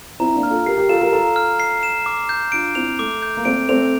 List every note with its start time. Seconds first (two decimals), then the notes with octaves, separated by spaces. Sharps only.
0.20 C4 E4 A#5
0.35 A#3 D4
0.43 F6
0.50 F4 A4
0.66 G4 A#4 C7
0.78 G4 A#4
0.89 F4 A4 E7
1.01 G4 A#4
1.12 F4 A4 A#5
1.36 F6
1.60 C7
1.83 E7
2.06 D6
2.29 G6
2.52 D4 F4 D7
2.75 C4 E4 F7
2.99 A3 D6
3.22 G6
3.37 A#3
3.45 A3 C4 D7
3.69 A3 C4 F7